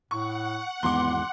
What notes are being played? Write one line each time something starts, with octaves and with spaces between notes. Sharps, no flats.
A2 F#5 C#6
G#1 E2 G#3 B3 C6 D6